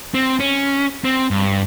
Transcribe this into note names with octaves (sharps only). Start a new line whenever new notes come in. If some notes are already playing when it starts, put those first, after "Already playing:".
C4
C#4
C4
G2